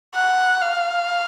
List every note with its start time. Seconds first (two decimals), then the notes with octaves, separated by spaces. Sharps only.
0.15 F#5
0.62 F5